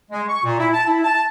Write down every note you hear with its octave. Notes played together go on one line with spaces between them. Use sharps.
G#3
C#6
A#2
E4
A5
E4
A5